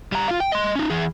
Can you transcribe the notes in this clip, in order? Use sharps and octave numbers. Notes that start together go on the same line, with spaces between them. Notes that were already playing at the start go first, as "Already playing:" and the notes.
G3 A#5
F4 F5
G5
D#5 C6
C#4 D#4
E3 G#4